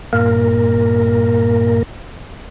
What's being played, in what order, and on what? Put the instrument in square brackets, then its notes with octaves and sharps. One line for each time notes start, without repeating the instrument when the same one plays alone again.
[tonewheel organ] G2 A#2 A#3 A#4